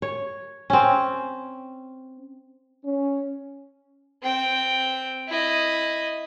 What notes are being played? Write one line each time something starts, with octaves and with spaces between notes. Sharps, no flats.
C#5
C4 C#4
C#4
C4 G5
E4 D#5